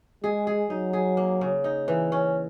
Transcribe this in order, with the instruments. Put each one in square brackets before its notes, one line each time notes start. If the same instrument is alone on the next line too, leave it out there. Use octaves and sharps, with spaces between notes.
[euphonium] G#3 [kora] G#4
[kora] G#4
[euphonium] F#3 [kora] D#4
[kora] G#4
A#3
C#3
D#4
E3
C#4